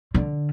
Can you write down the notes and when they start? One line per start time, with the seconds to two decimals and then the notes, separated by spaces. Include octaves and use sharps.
0.14 D3